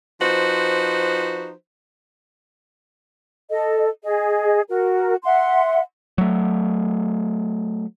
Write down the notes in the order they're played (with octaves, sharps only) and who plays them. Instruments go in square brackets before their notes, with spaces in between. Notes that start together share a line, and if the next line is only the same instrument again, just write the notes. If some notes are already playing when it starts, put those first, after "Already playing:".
[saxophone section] F3 D#4 F#4 B4 C5
[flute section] A4 D#5
G#4 D#5
F#4 A#4
E5 F#5 C6
[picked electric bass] F#3 A3